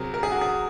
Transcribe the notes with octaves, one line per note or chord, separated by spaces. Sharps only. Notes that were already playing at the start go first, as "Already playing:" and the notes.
Already playing: C3 F#3 G#4 A#4
A#4
G#4
F#4
G#4